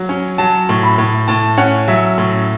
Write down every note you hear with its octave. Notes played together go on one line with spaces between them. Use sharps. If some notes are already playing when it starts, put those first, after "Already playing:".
Already playing: F#3
C#4
F#3 A5
A2
B5
A2
A2 A5
C#4 F#5
F#3 E5
A2